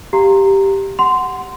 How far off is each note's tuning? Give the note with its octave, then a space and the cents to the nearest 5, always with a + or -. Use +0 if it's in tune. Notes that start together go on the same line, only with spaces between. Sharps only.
G4 +0 F5 +0 A#5 -10
F#5 +0 C6 -15